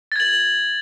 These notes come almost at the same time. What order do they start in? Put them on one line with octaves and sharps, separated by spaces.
A6 G#6 F#7